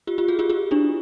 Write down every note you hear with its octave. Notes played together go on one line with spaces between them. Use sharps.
F4 G4
F4 G4
F#4 G#4
F4 G4
F4 G4
D4 E4